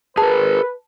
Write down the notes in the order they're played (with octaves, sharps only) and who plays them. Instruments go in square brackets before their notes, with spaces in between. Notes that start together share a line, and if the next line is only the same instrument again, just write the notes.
[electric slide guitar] G#4 A#4 [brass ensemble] B4 [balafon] A5